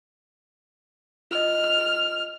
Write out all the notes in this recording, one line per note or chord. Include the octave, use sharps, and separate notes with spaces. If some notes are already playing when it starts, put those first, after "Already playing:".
F4 D#5 F6